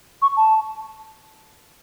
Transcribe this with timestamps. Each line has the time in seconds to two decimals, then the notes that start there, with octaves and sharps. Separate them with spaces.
0.22 C#6
0.37 A5